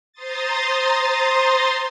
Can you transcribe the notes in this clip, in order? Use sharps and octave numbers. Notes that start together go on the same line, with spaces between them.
C5 A#5 C6 D#6 A6